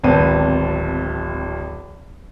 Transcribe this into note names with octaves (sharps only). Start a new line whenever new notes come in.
D1 G#1 B3 C4 A5 D#7